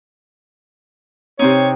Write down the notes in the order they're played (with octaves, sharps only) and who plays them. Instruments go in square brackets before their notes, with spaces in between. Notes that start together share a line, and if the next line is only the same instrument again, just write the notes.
[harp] C3 C4 D#4 [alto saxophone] C#5